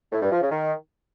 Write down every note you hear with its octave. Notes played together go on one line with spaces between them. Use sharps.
A2
G2
F3
C#3
D#3